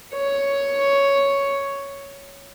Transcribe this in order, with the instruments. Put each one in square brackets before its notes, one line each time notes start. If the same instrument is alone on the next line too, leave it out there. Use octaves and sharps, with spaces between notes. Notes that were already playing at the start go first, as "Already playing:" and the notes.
[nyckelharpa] C#5